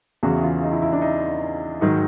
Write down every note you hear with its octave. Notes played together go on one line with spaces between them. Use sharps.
E2 C#3 E3 F#4
F4
D#4
E4
E4
D4
D#4
G#2 D#3 F#3 D#4